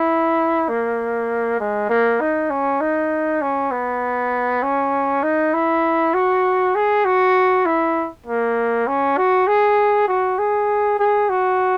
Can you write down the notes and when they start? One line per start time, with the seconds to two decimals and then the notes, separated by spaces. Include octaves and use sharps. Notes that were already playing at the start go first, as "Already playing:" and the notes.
Already playing: E4
0.68 A#3
1.60 G#3
1.89 A#3
2.20 D#4
2.50 C#4
2.80 D#4
3.42 C#4
3.71 B3
4.63 C#4
5.23 D#4
5.54 E4
6.14 F#4
6.75 G#4
7.05 F#4
7.66 E4
8.26 A#3
8.87 C#4
9.17 F#4
9.47 G#4
10.08 F#4
10.39 G#4
10.99 G#4
11.29 F#4